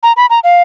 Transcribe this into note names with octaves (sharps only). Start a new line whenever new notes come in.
A#5
B5
A#5
F5